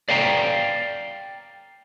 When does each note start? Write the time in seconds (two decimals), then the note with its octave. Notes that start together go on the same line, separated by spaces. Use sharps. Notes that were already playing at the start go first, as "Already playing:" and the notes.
0.09 D5 F5 G5 A#5